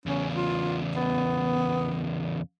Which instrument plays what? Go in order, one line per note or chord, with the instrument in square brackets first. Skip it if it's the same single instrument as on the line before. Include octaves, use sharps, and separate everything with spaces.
[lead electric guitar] E2 C#3 [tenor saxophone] C#4
[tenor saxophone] F4
B3